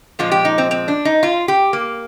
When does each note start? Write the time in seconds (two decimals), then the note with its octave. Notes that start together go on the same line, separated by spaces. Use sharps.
0.19 A#2 F3 G#3 F4
0.31 G4
0.45 D#4
0.58 C4
0.71 C4
0.88 D4
1.05 D#4
1.23 F4
1.48 G4
1.73 A#3